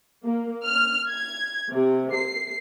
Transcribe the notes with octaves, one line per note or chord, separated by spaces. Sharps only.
A#3
F6
G#6
C3
C7